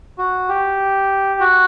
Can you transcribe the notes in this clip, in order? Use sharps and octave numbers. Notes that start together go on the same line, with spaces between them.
F#4
G4
F#4